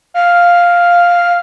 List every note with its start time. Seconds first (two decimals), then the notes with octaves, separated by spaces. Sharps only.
0.14 F5